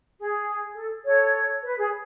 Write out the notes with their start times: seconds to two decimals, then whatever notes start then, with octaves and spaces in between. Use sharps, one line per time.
0.19 G#4
0.76 A4
1.05 A4 C#5
1.64 B4
1.77 G#4